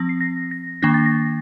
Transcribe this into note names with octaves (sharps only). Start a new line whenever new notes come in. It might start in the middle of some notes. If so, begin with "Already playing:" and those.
Already playing: F3 C4 A#6
C7
A#6
A#6
D#3 A#3 D4 A#6
A6
A#6